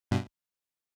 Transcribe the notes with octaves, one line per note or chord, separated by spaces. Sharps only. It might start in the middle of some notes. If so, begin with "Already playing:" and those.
G2 B2